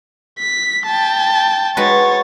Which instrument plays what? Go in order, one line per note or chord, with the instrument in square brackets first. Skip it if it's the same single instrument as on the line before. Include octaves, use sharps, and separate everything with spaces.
[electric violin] B6
G5 A5
[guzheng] G#3 F#4 B4 [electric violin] C#5 A6